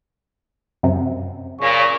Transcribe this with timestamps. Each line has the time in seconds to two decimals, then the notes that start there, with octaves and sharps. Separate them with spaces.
0.83 F#2 C3
1.61 A#2 C#3 C#6